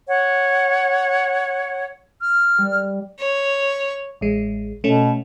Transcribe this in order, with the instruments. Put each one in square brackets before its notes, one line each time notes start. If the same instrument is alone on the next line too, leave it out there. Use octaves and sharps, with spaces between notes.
[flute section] C#5 F#5
[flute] F6
[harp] G3
[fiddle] C#5
[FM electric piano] A1 G#3
[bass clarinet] B2 [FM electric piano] A3 C#4